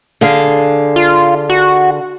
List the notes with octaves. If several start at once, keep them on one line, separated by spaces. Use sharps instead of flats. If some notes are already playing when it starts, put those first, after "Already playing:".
D3 G#4 F5
F4
F#4